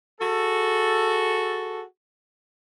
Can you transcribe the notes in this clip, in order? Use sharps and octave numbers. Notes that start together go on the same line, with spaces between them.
F#4 G#4 A4